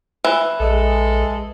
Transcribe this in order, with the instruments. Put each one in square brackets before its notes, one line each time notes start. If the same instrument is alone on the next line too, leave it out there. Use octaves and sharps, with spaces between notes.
[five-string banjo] E3
[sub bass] A#1 [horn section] G#3 A4